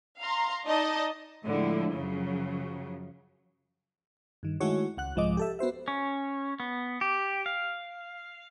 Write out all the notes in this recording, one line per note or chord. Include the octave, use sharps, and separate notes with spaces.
F5 A#5 C6
D#4 D5 D#5 A5
A2 D3 F3 G#3 E4
F#2 C#3 F3 F#3
G2 D#3
D#3 G#3 A3 E4 F#4 C#5
C#2 F#5 F#6
C2 G#2 F3 G#3 D#5 D6
G4 A4 E5
B3 F#4 C5 E5
C#4
B3
G4
F5